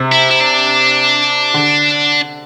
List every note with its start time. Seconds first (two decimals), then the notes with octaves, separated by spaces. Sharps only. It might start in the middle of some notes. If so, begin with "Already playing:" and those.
Already playing: C3
0.12 E4
0.31 E4
0.40 D4
1.54 D3